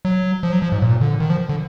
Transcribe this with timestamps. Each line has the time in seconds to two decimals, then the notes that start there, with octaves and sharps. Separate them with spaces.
0.05 F#3
0.43 F3
0.52 F#3
0.62 F3
0.72 G#2
0.82 A#2
1.01 D3
1.20 D#3
1.30 F3
1.49 D3